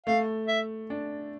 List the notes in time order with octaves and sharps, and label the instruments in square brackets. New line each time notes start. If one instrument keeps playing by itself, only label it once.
[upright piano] A3 [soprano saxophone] F5
[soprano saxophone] E5
[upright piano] D4